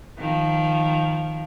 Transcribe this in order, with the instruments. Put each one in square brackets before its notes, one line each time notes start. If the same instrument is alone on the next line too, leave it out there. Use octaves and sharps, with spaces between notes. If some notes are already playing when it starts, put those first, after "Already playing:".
[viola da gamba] D#3 F3